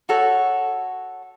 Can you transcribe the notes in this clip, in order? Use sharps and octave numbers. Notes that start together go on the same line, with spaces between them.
F#4 A4 C#5